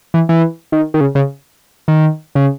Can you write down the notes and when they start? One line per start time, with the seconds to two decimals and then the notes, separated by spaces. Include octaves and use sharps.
0.14 E3
0.29 E3
0.72 D#3
0.94 D#3
1.01 C#3
1.15 C#3
1.88 D#3
2.35 C#3